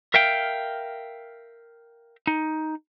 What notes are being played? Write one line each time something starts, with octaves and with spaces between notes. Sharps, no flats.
A#4 E5 F5 G5
D#4